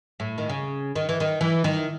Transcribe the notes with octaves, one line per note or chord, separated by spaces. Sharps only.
A2
D#3
C#3
D#3
E3
D#3
E3
D#3